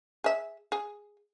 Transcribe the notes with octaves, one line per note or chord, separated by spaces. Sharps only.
G#4 E5
G#4